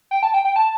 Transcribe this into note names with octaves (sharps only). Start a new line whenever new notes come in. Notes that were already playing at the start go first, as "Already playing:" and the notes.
G5
A5
G5
G5
A5